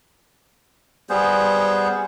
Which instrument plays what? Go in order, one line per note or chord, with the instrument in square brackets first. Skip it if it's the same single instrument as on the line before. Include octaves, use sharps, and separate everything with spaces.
[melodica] G3 B3 G#4 C5